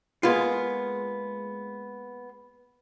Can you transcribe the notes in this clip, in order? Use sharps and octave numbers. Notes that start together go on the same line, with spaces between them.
G#3 A#3 B3 F4